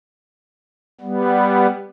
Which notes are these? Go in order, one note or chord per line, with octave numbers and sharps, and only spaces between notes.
G3 B3